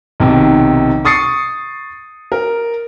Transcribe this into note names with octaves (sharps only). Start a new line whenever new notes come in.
B1 C3 D#3
C#6 D#6 A6 C7 C#7
A#4